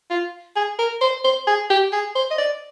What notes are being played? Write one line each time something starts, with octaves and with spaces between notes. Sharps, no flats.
F4
G#4
A#4
C5
C5
G#4
G4
G#4
C5
D#5
D5